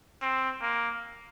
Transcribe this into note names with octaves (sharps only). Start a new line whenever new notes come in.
C4
A#3